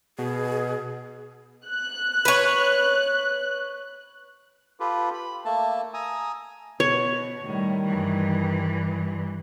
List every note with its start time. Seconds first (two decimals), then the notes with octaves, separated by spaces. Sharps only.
0.19 B2 G#4
1.65 F#6
2.25 B4 C#5
4.80 F4 G4 A4 B4
5.14 B5
5.45 A3 A#3 A4 A5
5.94 G#5 A#5 D#6 E6
6.80 B2 C#5
7.44 A2 D#3 G3
7.85 G2 E3